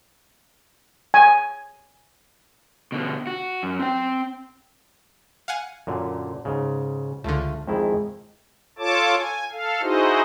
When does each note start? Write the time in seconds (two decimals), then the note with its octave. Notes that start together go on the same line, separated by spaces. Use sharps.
1.14 G#5
2.92 B2 D3
3.27 F#4
3.63 F#2
3.80 C4 G5
5.48 F5 F#5 G#5
5.87 F#2 A#2 D3
6.45 G#2 C#3
7.24 C#2 D3 A3 F4
7.68 F2 D#3 G#3 E4
8.79 F4 A4 C#5 A5 D6
9.17 G#5
9.52 A4 F5
9.82 D#4 E4 F#4 G#4 C5 D#5